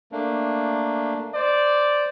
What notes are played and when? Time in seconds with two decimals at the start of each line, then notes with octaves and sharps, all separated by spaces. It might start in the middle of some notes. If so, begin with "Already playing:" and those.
0.12 A3 A#3 D4
1.35 C5 D5